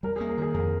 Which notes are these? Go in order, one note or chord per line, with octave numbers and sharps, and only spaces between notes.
G3 A#4
G#4
A#3
A#4
D#3 G#4
F2 A#4